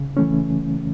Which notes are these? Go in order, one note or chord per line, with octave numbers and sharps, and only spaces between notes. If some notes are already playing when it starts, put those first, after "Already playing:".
Already playing: C#3
E3 A3 C#4